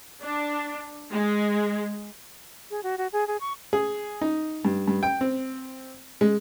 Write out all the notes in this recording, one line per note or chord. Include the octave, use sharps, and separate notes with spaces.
D4
G#3
G#4
F#4
F#4
G#4
G#4
C#6
G#4
D#4
G2
G2
G5
C4
G#3